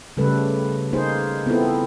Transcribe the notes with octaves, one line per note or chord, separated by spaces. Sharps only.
C#3 G3 A3 A4 B4
A#3 D#4 G#4 C5
B3 C4 E4 F4 A4